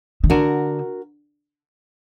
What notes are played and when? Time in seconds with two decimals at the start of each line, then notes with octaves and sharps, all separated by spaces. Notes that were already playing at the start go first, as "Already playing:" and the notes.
0.24 D#3
0.30 D3 F#4 A#4